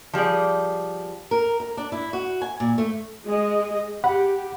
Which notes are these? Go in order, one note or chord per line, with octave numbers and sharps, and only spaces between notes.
F3 G3 G#4 D5
A#4
A#4
D4
E4
F#4
G#5
A#2
A3
G#3 G#4 D#5
G4 F#5 B5